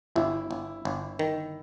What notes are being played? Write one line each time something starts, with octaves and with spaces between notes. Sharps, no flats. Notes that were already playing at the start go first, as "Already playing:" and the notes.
G1 E4
G1
G1
D#3